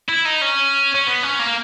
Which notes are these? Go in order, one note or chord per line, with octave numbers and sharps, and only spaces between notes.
E4
D#4
C#4
C#4
B3
C#4
A#3